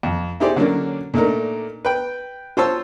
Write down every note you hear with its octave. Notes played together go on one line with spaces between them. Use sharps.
F2
D#4 E4 G4 G#4 C5 D5
D3 F#3 A#3 C#4 D4
A#2 A3 D4 D#4 A#4
B4 G5
F4 C5 C#5 A5 E6